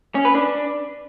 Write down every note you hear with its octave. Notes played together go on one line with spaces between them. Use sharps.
C#4
B4
D4